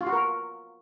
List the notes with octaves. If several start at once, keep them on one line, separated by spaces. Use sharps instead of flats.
F4
F#4
A#4